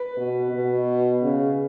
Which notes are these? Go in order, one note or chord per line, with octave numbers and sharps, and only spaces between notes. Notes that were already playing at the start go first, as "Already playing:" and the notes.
Already playing: B4
B2
B2
C#3